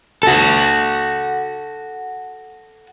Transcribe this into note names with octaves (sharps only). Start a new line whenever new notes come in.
F#4 A4